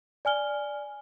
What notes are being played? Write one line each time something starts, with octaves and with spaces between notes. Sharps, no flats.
D5 G#5 F6 G7